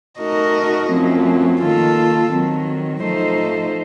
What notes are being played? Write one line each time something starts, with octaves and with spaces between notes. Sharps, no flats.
A3 D#4 F#4 A#4 D#5
F#2 F3 A3 C4
D#3 A#3 F4 A4
D#3 F#3 C4
F3 A3 D#4 A4 C5